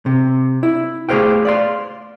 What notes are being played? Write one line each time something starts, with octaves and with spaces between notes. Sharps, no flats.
C3
E4
A3 G4 G#4 C5 F5 G5
D5 F5 C6